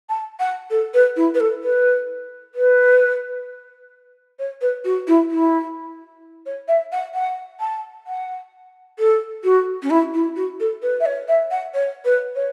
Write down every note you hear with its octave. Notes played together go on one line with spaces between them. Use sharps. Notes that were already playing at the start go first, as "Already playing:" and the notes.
A5
F#5
A4
B4
E4
B4
A4
B4
B4
C#5
B4
F#4
E4
E4
C#5
E5
F#5
F#5
A5
F#5
A4
F#4
C#4
E4
E4
F#4
A4
B4
E5
C#5
E5
F#5
C#5
B4
C#5